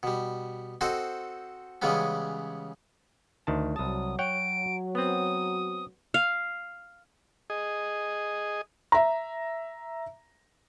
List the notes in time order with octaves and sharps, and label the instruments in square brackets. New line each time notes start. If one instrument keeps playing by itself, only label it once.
[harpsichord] B2 G3
C4 F#4 A4 C5 D#5
C#3 E3 G3 G#3 B3 C#4
[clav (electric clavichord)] D2 D#3 A5
[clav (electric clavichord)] C2 A5 [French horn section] F#3 [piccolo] D#6
[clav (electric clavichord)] C#5 F#5 G5 [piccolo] D7
[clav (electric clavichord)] B3 C4 [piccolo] D#6
[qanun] F5
[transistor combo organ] G#4 D#5
[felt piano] E5 A#5